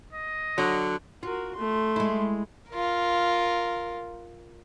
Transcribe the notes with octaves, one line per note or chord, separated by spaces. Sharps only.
D#5
D3 F#3
F4 F#4 A#4
A3 C6
G#3 E4
F4 A#4